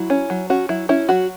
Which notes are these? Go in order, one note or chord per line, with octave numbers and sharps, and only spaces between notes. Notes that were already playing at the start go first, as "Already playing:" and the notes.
Already playing: F#3 E4
C#4
F#3
C#4 F#4
F#3 E4
C#4 E4
F#3 F#4